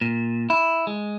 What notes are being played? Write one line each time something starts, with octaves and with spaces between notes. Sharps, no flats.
A#2
E4
G#3